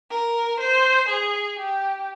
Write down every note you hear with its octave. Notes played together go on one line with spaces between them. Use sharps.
A#4
C5
G#4
G4